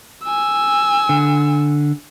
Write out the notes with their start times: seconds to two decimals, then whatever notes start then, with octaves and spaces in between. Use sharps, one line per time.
0.23 G#5 E6
1.09 D3